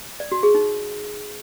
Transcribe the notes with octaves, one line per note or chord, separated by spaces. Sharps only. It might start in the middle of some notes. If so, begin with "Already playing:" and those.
D5
F#4
G#4
D#4